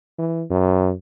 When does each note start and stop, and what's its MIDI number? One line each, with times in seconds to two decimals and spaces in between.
0.19 0.43 52
0.50 0.93 42